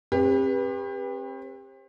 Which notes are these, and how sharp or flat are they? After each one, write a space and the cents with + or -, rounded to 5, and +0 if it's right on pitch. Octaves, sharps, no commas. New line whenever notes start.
C4 +40 G4 +30 B4 -20